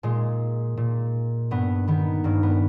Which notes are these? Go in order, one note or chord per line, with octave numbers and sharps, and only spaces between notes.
A#2 G#3
A#2
G2 B3
D#3 B3
G2 A#3
B3